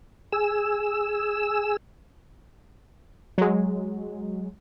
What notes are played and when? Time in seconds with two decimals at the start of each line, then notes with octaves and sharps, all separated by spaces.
0.33 G#4 E6
3.38 F#3 G#3